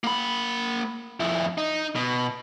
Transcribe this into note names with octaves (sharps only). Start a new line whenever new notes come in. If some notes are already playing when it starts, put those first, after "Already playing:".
A#3 B5
F2 E4
D#4
B2